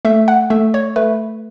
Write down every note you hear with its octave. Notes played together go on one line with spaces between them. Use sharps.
A3 E5
F#5
A3 E5
C#5
A3 B4